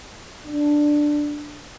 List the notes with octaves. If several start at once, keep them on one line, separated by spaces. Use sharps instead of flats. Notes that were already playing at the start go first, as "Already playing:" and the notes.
D4